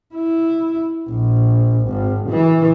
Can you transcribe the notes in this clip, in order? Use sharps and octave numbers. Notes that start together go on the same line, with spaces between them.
E4
A#1
G#1
E3